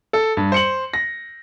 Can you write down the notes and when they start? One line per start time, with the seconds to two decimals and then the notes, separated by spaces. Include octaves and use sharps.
0.13 A4
0.37 G2
0.52 C5 C#7 F#7
0.93 A#6